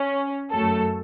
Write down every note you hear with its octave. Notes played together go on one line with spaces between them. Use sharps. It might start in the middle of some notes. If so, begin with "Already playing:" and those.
Already playing: C#4
F#2 F#3 A3 A4